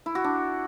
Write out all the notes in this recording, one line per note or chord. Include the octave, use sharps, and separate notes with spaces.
E4
F#4
D4